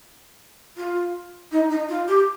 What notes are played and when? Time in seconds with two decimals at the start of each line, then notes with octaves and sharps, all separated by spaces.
0.77 F4
1.52 D#4
1.69 D#4
1.88 F4
2.07 G4